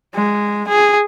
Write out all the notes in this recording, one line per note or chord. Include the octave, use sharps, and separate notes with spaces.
G#3
G#4